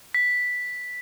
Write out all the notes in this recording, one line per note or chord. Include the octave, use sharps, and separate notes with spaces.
B6